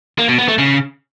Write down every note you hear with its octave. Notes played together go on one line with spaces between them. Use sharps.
A#3
B2
B3
A3
C#3